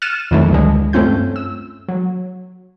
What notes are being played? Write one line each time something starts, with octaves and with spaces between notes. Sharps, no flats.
F6 F#6 A6 C#7 D#7 E7
F2 D#3 E3 F#3 A3
D2 G#2 D3 G#3
G2 A3 C4 C#4 F4 G6
E6
F#3